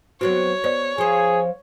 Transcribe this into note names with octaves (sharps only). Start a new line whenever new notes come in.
F#3 B3 C4 F#4 C#5
B3 C5 D5
F3 C4 G#4